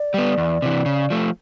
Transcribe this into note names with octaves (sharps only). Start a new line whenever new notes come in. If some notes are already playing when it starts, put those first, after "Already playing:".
Already playing: D5
G3 B3
E2
C3 E3
C#3
F3 A3